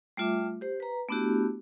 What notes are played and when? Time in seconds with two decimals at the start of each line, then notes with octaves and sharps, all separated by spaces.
0.17 G3 A3 F4 E5 D6
0.61 G4 C5
0.80 B4 A#5
1.09 A3 B3 D4 E4 F#4 G4